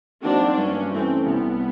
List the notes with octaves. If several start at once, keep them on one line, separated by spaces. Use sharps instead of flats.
F#3 A#3 C4 D4 D#4 F#4
G2 C#4
E3 A3 C4 C#4
C2 B3